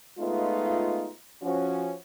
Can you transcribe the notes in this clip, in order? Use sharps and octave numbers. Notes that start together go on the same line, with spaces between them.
G#3 A3 B3 D#4 F4
F3 C#4 F#4